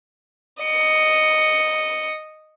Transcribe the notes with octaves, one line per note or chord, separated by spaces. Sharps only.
D#5 C#7